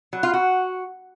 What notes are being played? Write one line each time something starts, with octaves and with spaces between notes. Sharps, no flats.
F#3
F4
F#4